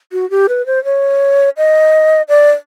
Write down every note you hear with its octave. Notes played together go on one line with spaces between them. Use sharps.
F#4
G4
B4
C5
C#5
D#5
D5